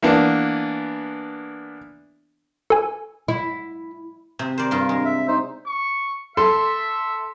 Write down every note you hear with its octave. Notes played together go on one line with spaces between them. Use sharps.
E3 A#3 B3 D4
A4 G#5
E4
C3
A#4 C5 D5
G2 F4 C6
G#3
E5
D#4 C5
C#6
A4 E5 C6